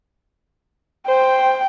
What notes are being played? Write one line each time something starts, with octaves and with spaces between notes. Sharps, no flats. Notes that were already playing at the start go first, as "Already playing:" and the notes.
C5 G5